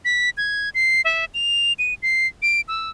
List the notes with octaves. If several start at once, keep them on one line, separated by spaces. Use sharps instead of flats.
B6
G#6
C7
E5
F7
D#7
C7
D7
E6